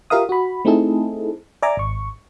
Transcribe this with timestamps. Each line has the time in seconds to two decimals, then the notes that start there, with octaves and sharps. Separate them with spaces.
0.10 F4 G4 A#4 E5 F5 D#6
0.29 F#4 B5
0.65 A3 C4 D#4 E4 G#4 A4
1.62 D5 E5 G#5 A#5 D6
1.77 G#1 C#6